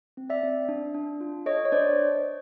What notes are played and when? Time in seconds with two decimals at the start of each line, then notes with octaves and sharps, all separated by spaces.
0.17 C4
0.30 D5 E5
0.43 C4
0.69 D4
0.94 D4
1.21 F4
1.46 A4 C#5 D#5
1.65 C#5
1.72 D4 C5 D5